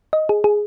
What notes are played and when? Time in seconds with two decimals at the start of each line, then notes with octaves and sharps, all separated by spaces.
0.13 D#5
0.29 G#4
0.44 G#4